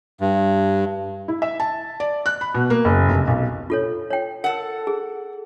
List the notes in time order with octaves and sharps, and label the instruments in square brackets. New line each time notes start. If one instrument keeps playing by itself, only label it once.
[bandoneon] G2
[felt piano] E4
E5
A5
D5
F#6
B5
B2
A#3
F#1
F1
B1
[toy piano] F4 A4 C#5
C#5 G5
[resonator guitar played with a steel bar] A4 F#5 [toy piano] A#4
[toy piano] G#4